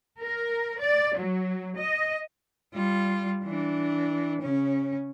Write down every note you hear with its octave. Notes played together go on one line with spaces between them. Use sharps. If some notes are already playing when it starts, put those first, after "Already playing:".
A#4
D5
F#3
D#5
G3 F4
E3 D4
C#3 C#4